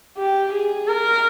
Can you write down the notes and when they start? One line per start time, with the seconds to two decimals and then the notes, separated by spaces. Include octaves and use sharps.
0.17 G4
0.53 G#4
0.87 A#4